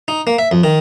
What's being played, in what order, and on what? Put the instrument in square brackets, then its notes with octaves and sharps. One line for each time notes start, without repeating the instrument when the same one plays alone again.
[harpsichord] D#4
A#3
E5
F2
D#3